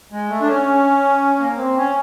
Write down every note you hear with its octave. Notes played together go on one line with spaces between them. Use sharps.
G#3
A3
D4
C#4
A#3
C4
C#4